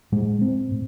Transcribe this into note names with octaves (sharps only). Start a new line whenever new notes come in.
A2 G#3
A2 C4
A2